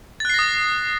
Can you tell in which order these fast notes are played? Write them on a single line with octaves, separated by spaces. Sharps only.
A6 F#6 C7 A#6 D#6